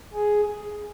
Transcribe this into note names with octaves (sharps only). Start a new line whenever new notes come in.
G#4